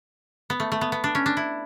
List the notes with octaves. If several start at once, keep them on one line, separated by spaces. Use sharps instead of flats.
B3
A3
A3
B3
B3
D4
C#4
D4
E4